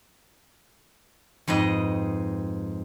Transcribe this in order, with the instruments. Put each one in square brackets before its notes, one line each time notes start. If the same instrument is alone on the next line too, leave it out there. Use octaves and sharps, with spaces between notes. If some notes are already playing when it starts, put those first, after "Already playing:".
[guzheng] F2 G#2 B4 D#5